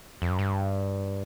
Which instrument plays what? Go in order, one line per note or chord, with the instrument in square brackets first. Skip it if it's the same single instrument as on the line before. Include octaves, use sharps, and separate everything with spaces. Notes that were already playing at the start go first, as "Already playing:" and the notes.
[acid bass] F2
F#2
G2